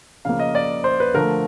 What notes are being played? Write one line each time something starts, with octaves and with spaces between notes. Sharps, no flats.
C#3 F3 A#3 F5
D#5
D5
C5
B4
D3 F3 A3 A#4